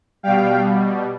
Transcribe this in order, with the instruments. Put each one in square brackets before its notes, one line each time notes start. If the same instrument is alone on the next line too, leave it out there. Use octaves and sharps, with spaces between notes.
[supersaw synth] B2 G3 F5 G5